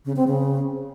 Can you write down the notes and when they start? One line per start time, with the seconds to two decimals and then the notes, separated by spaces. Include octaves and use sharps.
0.05 C#3
0.16 C4
0.27 C#3